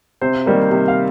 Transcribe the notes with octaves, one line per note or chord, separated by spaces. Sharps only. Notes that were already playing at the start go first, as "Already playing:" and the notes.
C3 C5
D#3 G3 A#3
C3
F5